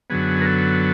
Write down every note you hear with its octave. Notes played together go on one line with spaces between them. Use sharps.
F#2 D3 F#3 B3 G#4
A#4
A4